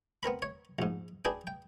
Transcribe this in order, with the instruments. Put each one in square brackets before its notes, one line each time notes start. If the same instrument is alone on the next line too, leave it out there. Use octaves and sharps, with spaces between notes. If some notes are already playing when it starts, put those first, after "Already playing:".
[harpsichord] B3 C4 A#4 B5
C#5
A#1 G#2
D4 G#4 B4 G5
G5